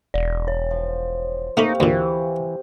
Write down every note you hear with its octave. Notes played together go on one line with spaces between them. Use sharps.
E1 D5
C#5
F3
C3 A3 A#3 D#4 F5 B5 C#6
D2 A#2 E3